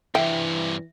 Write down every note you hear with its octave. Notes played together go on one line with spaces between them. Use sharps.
G2 C3 E3 E5 G5